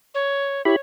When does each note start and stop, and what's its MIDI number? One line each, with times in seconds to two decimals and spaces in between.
0.14 0.61 73
0.65 0.76 64
0.65 0.76 67
0.65 0.80 73
0.65 0.76 83